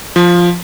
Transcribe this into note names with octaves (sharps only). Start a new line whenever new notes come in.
F3